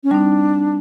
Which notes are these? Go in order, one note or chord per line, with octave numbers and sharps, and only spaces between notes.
C#4
G3 C4 D4 D#4